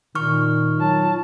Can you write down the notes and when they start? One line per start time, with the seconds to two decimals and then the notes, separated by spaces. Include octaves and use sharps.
0.15 A#2 D#3 C#6 F6
0.77 F#3 F4 A5